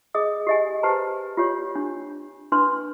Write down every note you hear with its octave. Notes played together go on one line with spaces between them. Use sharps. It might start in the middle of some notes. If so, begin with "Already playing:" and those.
G#4 D#5 D#6
G4 D#5 G#5
G4 B4 C5 A5 A#5
F4 G4 C#5
D4
D4 B4 C6